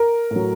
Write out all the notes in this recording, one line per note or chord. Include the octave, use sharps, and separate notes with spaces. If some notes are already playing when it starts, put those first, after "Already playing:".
Already playing: A#4
A2
F#3